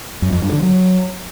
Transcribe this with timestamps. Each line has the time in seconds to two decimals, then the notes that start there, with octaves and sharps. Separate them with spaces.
0.22 F#2
0.32 F2
0.42 G2
0.52 D3
0.63 F#3